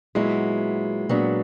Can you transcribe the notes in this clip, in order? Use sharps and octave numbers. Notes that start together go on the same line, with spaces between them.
A#2 F#3 G#3 B3 E4
A#2 F#3 B3 D4